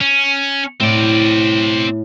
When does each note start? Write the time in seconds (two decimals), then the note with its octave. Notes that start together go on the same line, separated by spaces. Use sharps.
0.01 C#4
0.80 A2 C4 D5